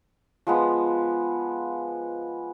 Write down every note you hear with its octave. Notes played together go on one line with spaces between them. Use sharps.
F3 G#3 B3